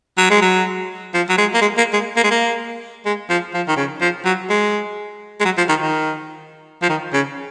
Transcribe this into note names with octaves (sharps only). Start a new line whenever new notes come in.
F#3
G#3
F#3
F3
F#3
G#3
A#3
G#3
A#3
G#3
A#3
G#3
A#3
G#3
F3
F3
D#3
C#3
F3
F#3
G#3
G#3
F#3
F3
D#3
D#3
F3
D#3
C#3